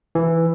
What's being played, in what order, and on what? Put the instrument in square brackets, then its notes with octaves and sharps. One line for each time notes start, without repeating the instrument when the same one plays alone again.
[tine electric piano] E3